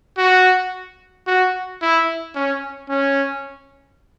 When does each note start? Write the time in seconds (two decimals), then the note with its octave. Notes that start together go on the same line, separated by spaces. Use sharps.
0.18 F#4
1.27 F#4
1.82 E4
2.36 C#4
2.90 C#4